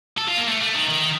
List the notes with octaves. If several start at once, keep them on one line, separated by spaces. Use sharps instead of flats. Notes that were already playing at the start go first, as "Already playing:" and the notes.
A4
F4
A#3
A3
A3
D#3
D#3